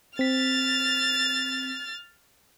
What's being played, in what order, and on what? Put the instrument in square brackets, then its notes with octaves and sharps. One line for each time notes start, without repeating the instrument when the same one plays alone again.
[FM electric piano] C4 B6 [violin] F6 A6